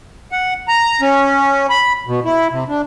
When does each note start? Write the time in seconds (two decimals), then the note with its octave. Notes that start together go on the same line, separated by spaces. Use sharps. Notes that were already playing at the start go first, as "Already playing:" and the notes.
0.32 F#5
0.68 A#5
1.01 C#4
1.70 B5
2.07 B2
2.25 E4
2.52 C3
2.68 D4